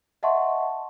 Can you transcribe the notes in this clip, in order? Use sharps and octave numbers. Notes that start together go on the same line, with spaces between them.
D#5 E5 F#5 A5 C6 C#6